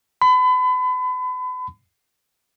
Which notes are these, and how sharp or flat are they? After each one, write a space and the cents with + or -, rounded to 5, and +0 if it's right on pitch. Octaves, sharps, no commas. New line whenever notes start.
B5 +35